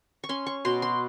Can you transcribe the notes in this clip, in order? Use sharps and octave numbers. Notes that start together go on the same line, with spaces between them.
C#6
C#4 C6
C#6
B2 C6
C6